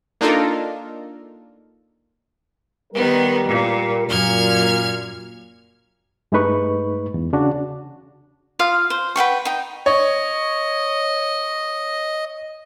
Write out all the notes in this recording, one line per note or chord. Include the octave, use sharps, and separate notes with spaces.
A#3 D4 D#4 F4 A4 A#4
D#3 G3 B3 A#4
A#2
F#2 A#2 F6 G#6
G2 G#3 A3 D#4 B4 C#6
E2
C#3 D4 F#4
F4 F5 D#6
C5
B4 F#5 G5 C#6
D#4 G5
C#5 D#5